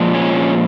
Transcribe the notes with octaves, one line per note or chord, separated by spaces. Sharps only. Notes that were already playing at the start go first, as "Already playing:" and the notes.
Already playing: A#2 F3 G#3
C#4